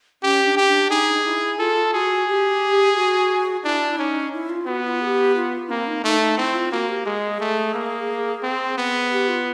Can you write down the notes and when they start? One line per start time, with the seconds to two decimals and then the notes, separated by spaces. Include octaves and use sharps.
0.23 C#4 G4
0.45 D4
0.57 G4
0.68 D4
0.90 D#4 G#4
1.25 E4
1.59 F4 A4
1.93 F#4 G#4
2.27 G4
2.96 F#4
3.64 D4 E4
3.91 E4
3.98 C#4 D#4
4.33 E4
4.49 F4
4.67 B3 F#4
4.84 F4
5.01 G#4
5.06 G4
5.36 F4
5.70 A#3 C4
5.87 D#4
6.04 A3 D#4
6.20 D#4
6.37 C4 E4
6.54 F4
6.72 A#3 F#4
6.89 G4
7.06 G#3 G#4
7.40 A3
7.74 A#3
8.43 C4
8.78 B3
9.11 G4
9.29 F4